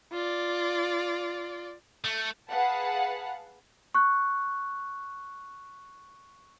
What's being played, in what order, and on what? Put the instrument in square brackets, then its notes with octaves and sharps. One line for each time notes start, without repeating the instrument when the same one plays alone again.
[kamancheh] F4 D5
[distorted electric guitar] A3
[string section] G#4 B4 F5 F#5 A5
[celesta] C#6 F#6